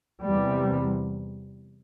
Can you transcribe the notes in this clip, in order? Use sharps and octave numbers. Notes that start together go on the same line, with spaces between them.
E2 C3 G3